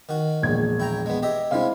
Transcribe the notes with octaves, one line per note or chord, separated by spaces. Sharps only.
D#3 F#4
E1 A#1 G#6
E4 G5 A#5
G#3 B3
G4 D#5 E5
C3 G3 G#3 E4 C5 F5